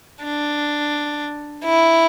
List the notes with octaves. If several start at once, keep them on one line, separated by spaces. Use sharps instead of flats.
D4
E4